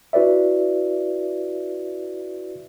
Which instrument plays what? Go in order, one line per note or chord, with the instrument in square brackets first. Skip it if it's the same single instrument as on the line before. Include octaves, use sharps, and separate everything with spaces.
[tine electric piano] E4 F#4 B4 D5 E5